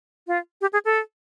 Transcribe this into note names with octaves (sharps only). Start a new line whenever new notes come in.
F4
G4
G#4
A4